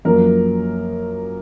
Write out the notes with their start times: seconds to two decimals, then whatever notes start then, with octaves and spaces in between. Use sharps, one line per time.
0.05 F#2 F3 A#3 A#4